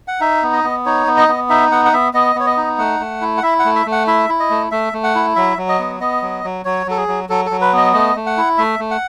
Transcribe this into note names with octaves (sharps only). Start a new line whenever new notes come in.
F#5
D#4 E5
B3
D#5
B3
D#4 C#5
B3
D#5
B3
D#4 E5
B3 F#5
F#5
B3 E5
B3 D#5
B3 C#5
D#5
D#4
A3 F#5
A3
E4
F#5
E4 E5
F#5
A3
E5
A3
F#5
E4 E5
E4
D#5
A3
A3 E5
A3
F#5
E4
F#3 E5
F#3
D#5
B3
B3 D#5
F#3
F#3
F#3 C#5
F#3 A4
G#4
F#3
F#3 A4
A4
F#3
B4
B3 D#5
A3 D#5
A3
F#5
E4
A3 E5
A3
F#5